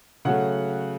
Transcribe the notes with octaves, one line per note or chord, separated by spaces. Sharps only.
C#3 F#3 A3 F#5